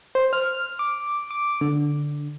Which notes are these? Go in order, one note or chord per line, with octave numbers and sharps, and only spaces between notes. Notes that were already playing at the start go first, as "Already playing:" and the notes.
C5
F6
D6
D6
D3